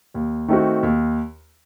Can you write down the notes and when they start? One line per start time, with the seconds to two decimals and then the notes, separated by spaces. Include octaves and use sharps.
0.14 D#2
0.48 D#3 A3 C4 F#4
0.83 D#2